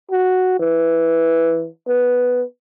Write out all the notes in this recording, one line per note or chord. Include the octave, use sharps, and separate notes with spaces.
F#4
E3
B3